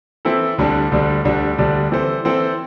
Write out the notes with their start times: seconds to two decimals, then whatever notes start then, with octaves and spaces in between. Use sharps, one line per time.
0.25 E3 C4 E4 A4
0.58 D2 D3 G3 D4
0.92 D2 D3 G3 D4
1.24 D2 D3 G3 D4
1.58 D2 D3 G3 D4
1.92 E3 C4 A4 C5
2.25 E3 C4 A4 C5